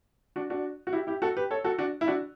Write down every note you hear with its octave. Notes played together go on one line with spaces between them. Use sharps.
D4 F#4
D4 F#4
F#4
E4 G4
E4 G4
F#4 A4
G4 B4
A4 C#5
F#4 A4
D4 F#4
E4
D4 F#4